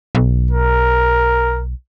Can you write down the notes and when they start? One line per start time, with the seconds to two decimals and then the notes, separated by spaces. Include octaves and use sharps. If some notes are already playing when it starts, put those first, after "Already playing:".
0.15 B1
0.51 A#4